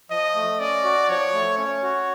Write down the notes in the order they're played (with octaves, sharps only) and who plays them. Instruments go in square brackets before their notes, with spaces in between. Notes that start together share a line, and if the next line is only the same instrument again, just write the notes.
[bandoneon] F3 [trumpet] D#5
[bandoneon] A3
[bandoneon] C#4 [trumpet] D5
[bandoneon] F#4
[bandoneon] F3 [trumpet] C#5
[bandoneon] A3
[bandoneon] C#4 [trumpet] C#5
[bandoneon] F#4